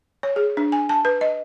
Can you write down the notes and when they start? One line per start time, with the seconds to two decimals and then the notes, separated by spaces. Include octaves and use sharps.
0.23 C#5
0.36 G#4
0.57 D4
0.72 G#5
0.89 A5
1.05 B4
1.21 D#5